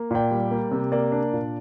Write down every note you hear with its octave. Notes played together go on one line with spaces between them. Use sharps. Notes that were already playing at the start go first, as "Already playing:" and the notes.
Already playing: A#3
A#2 D5 G5
G3
A#3
C3
A#3 D5
D4
A#2